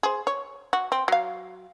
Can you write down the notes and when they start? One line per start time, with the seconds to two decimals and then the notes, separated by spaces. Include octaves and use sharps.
0.03 G#4 C5
0.27 C#5
0.73 F#4
0.92 C4
1.08 F#3 F5